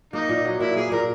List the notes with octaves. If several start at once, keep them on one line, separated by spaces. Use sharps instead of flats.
A#3 D#4
A#2
F#3
A#2 E4
A#3 G#4
A#2 A#4